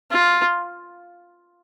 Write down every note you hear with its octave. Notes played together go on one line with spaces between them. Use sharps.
F4